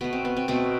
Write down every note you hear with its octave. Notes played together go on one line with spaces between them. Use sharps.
B2 A3 B3
C4
B3
C4
B2 A3 C4